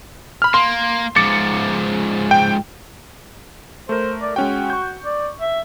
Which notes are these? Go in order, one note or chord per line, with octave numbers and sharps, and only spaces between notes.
B5 F6
A#3 C6
G#2 F3 D6 A6 C#7
G5
A3 A#4 C5
D5
G#3 C#4 F#4 G5
C#6 G6
D5
E5